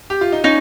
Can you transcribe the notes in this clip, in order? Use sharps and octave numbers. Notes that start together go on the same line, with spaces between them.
G4
F4
D#4
C#4 D#4